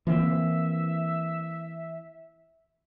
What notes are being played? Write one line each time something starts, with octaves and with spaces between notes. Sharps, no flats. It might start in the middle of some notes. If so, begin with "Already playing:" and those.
E3 A#3 C4 E5